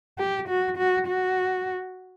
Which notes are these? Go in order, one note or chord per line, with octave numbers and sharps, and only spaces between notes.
G4
F#4
F#4
F#4